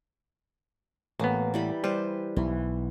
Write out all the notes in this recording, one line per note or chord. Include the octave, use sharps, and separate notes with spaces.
A1 A#3 B3
E3 G3 B5
G3 B4 C5
B1 E3